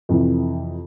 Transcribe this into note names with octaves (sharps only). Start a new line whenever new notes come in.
F2 C3 E3